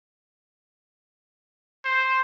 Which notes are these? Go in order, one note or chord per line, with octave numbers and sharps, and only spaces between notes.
C5